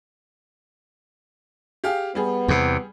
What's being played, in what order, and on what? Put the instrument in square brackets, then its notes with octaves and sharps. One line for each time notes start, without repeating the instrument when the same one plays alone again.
[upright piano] G4 G#4 F5
[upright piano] G3 G#4 [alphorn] B3
[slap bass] E2 C3